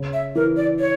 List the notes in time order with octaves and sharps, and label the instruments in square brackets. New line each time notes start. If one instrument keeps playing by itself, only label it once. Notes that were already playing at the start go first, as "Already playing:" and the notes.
Already playing: [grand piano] C#3
[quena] E5
[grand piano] E3 [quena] A#4
[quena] D5
C#5